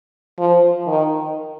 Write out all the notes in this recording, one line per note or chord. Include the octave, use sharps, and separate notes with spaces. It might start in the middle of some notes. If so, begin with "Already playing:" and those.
F3
D#3